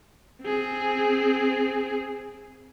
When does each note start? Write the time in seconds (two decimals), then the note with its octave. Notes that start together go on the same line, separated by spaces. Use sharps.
0.42 C4 G#4